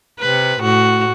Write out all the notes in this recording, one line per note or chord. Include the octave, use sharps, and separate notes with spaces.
C3 B4
A2 F#4